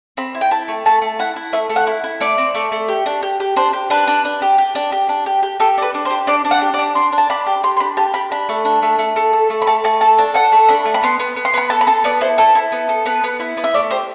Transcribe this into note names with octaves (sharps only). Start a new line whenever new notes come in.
C4 B5
E4
G5
E4 A5
A3
A3 A5
A3
E4 F#5
E4
A3 E5
A3
F#5
E4
E4
A3 D5
C4
A3
A3
G4
D4
G4
G4
D4 C5
G4
D4 B4
D4
D4
G4
G4
D4
G4
D4
G4
G4
G4 A4
D4 B4
D4
C5
G4
D4 D5
D4
F#5
G4
D5
D4
D4 C6
D4
A5
D4 B5
G4
G4 C6
C6
D4 B5
G4 A5
G4 B5
D4 B5
A3
D4
A3
A3
A3
A4
A3
B5
A3 A5
A3 A5
A4 A5
D4 A5
A4 F#5
A3
D4 B5
A3
B5
B3 C6
B3
B3
C6
B3 B5
A4 A5
B5
A4 A5
B3 D5
E4 C5
E4 A4
E4
B3
A4
B3 B4
B3
E4
B3
E5
A3 D5
G4 C5